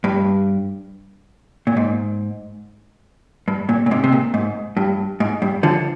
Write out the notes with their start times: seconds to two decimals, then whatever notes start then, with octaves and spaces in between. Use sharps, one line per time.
0.04 G2
1.67 A#2
1.77 G#2
3.48 G2
3.69 A#2
3.86 A#2
3.91 G#2 C3
4.04 C3
4.12 A#2
4.34 G#2
4.77 G2
5.20 G#2
5.42 G2
5.63 D3 F3